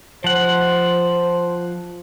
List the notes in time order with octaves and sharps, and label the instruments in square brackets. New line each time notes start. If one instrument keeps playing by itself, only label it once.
[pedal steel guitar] F3 F#5 [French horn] C5